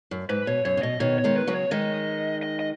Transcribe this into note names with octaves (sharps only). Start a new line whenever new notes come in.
F#2
G#2 B4
B2 C#5
F#2 C#5
C#3
B2 D#5
B2 D#3 C#5
C#5
D#3 G#3
B4
C#3 F#3
C#5
D#3 G#3 D#5
D#5
D#5